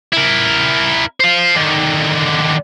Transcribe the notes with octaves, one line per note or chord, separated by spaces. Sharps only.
E4 A#4
C5 F5
D3 D#3